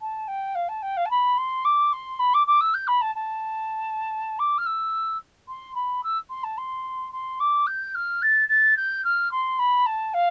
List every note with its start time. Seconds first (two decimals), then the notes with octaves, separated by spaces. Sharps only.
0.01 A5
0.28 G5
0.55 F5
0.69 A5
0.82 G5
0.97 F5
1.06 A5
1.11 B5
1.38 C6
1.65 D6
1.93 C6
2.19 B5
2.34 D6
2.47 D6
2.61 E6
2.74 G6
2.88 B5
3.01 A5
3.15 A5
4.39 D6
4.58 F6
4.66 E6
5.48 C6
5.75 B5
6.04 E6
6.30 C6
6.44 A5
6.58 C6
7.13 C6
7.40 D6
7.67 G6
7.95 F6
8.22 A6
8.49 A6
8.77 G6
9.05 F6
9.32 C6
9.59 B5
9.86 A5
10.14 F5